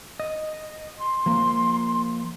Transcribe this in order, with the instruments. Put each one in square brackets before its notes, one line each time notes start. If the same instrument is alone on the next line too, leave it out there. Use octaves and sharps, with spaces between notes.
[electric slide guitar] D#5
[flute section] C6
[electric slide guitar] F3 A#3